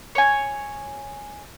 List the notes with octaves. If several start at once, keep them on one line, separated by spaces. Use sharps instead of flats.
C#5 G#5